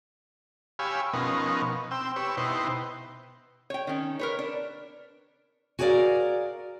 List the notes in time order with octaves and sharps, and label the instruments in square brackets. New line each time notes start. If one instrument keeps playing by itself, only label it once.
[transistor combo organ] G4 C#5 F5 G#5 B5 E6
B2 F3 B3 C#4 D#4 A#4
C4 G5 E6
G4 B4 C#5 E6
B2 D#4 E4 B4 C5 G5
[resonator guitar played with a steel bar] C#5 G5
D#3 C#4
A#4 B4 C#5
D4
[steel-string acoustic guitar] F#4 G#4 A#4 C#5 D5 F5